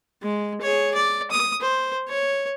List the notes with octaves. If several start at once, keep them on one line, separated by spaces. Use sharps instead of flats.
G#3
G#4 C#5
D5
D#6
C5
C#5